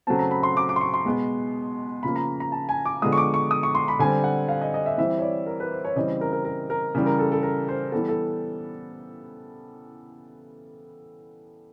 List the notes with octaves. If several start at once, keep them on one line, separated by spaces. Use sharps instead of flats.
C#3 F#3 A3 C4 A5
A#5
B5
C6
D6
D6
C6
C#6
C6
B2 G#3 B3
C#3 F3 A#3 B5
A#5
A#5
A5
G#5
D6
D3 F3 G#3 B3 D#6
C#6
D6
C#6
D#6
C#6
C6
B5
D3 G3 C4 G#5
F#5
F5
D#5
D#5
E5
E3 G3 C4 E5
C#5
D5
A#4
B4
C5
C#5
C#3 E3 G3 C4 D#5
A#4
A#4
A#4
A#4
C#3 E3 G3
A#4
A4
A4
A#4
C5
E3 G3 B3 A4
A4